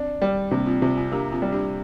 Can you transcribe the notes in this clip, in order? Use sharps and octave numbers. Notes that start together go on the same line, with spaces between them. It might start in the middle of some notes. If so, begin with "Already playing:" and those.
Already playing: C4 D4
G3
C3 A#3 D4
C4 F4
C3 C4 F4
C4 F4
A#3 D4 G4
C4 F4
G3
D4 G4